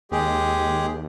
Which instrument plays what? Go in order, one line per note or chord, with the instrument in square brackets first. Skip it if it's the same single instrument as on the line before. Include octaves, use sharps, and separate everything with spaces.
[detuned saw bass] D#2 [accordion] G#3 G4 G#4